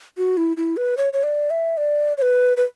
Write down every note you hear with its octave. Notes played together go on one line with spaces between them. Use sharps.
F#4
E4
E4
B4
C#5
C#5
D5
E5
D5
C#5
B4
B4